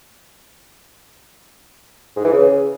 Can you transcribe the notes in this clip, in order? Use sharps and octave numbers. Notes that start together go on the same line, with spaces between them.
G#2
E3
C#3